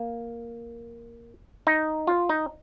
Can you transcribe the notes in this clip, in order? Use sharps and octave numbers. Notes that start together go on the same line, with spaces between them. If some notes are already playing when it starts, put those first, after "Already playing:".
Already playing: A#3
D#4
F4
D#4